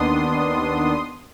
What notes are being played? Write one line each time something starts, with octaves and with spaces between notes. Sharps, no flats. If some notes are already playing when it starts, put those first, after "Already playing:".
Already playing: D#2 D#3 B3 D4 C6 D#6